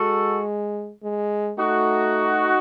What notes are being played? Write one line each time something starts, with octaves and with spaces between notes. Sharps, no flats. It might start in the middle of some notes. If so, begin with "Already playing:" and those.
Already playing: G#3 F#4 A4
G#3
A3 D#4 F#4